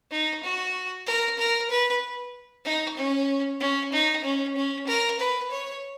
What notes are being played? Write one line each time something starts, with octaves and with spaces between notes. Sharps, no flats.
D#4
F#4
A#4
A#4
B4
D#4
C#4
C#4
D#4
C#4
C#4
A#4
B4
C#5